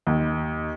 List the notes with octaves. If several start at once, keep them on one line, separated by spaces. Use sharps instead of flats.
D#2